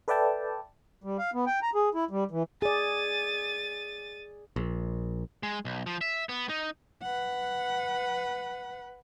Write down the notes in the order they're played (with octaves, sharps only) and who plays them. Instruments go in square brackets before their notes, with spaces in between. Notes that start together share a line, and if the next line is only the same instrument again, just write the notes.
[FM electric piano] A4 B4 D5 E5 G5 A5
[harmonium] G3
F5
B3
G5
A#5
G#4
E4
G3
E3
[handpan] G#4 D5 [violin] A6 D#7
[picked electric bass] A#1
[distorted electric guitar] G#3
B1
F3
E5
B3
D#4
[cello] B4 F#5